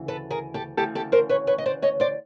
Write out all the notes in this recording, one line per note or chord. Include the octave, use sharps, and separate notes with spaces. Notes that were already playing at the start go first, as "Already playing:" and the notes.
Already playing: D2 C#3 E3
A4 B4
G#4 A#4
G4 A4
D2 C#3 E3 G4 A4
G4 A4
A#4 C5
B4 C#5
B4 C#5
D#5
C5 D5
C#5 D#5
C5 D5